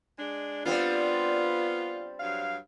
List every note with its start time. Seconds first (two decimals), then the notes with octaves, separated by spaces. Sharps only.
0.19 G#3 D4
0.65 G3 B3 C4 D4 F4
2.19 G2 F#3 F5